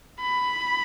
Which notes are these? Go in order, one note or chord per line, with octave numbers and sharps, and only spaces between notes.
B5